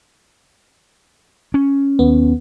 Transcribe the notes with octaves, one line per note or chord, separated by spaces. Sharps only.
C#4
D#2 B3